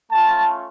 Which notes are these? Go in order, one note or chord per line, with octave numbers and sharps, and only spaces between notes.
A3 C#4 F4 A5